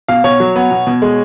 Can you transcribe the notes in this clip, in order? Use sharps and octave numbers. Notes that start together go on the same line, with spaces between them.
B2 F5
B2 C#5
F#3
B3
B2
B2
G#3